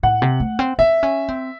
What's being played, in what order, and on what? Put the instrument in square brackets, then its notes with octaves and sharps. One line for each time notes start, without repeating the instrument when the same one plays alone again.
[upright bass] A2 [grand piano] F#5
[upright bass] C3
A3
C4
[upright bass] C4 [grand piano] E5
[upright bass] C#4
C4